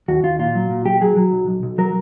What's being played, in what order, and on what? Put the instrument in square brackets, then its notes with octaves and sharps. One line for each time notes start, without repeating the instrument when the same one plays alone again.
[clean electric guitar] D#2 F#4
D#2 F4
A#2 F4
F#3
A#2
B1 G4
F#3 G#4
F#3
B1
B1
B1
F#3 A#4